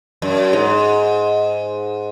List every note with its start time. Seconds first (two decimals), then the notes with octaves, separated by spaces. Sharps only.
0.22 F#2
0.53 G#2